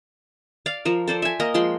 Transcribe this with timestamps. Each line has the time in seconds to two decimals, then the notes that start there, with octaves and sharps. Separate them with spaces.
0.66 D5 F5
0.85 F3 A#4
1.08 A4 C5 D5
1.22 E5 G#5
1.40 A#3 A#4 D#5
1.54 F3 G#3 G5 C6